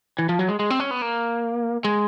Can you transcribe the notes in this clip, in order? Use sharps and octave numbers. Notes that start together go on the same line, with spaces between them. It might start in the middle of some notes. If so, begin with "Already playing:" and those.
E3
F3
F#3
G#3
G#3
C4
C#4
B3
A#3
G#3